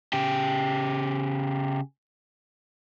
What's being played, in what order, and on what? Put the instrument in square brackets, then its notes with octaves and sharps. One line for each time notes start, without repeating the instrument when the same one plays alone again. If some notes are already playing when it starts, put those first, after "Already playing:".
[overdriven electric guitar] C#3 G4